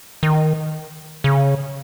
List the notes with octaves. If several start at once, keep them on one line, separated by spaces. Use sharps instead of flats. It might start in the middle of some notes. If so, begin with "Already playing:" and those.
D#3
C#3